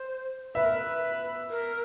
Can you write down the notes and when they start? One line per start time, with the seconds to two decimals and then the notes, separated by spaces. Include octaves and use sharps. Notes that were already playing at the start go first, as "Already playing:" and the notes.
Already playing: C5
0.54 B4 E5
0.65 A#4
0.76 B4
1.50 A#4